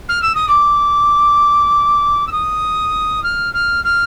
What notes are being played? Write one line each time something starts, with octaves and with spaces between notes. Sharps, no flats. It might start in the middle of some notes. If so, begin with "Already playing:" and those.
F6
E6
D#6
D6
E6
D#6
F6
F6
F6